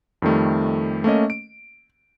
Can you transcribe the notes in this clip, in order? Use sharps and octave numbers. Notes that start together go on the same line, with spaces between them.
F2 D#3 G3 A3
A3 A#3 C#4 D#5
D7